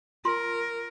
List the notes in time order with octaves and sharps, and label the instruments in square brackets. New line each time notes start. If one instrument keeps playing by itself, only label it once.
[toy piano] F4 C6 [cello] A#4